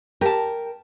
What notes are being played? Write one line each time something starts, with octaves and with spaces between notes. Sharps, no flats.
G4 A#4 A5